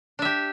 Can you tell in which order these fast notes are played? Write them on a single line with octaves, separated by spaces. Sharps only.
D4 E5 G4